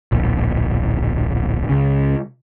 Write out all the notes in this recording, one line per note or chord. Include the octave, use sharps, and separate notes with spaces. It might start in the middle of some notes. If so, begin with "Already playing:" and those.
D1 A#1
C#2 C#3